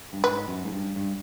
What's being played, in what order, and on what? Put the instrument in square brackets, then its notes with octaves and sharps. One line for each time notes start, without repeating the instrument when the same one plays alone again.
[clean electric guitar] G2
[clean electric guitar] G#2 [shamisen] B4
[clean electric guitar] F#2
G#2
G2
G2